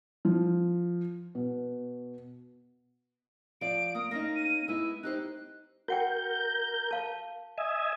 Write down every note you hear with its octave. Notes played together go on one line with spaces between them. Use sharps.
F3
B2
F3 D5 D7
A#3 D#6
A#3 C#4 D#4 A#6
D#7
G#3 B3 E4 E6
D#4 G4 C5 F#6
F#4 A#4 F#5 G5 G6
F5 A5
D#5 E5 G#5